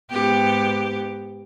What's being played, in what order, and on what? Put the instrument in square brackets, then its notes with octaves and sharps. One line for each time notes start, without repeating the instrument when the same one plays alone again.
[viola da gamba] G#2 B3 G4